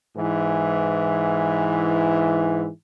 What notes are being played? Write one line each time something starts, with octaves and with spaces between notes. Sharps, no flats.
G#2 E3